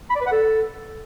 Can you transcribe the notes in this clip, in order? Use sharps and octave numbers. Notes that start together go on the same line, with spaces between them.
B5
D5
B4
F#5
A4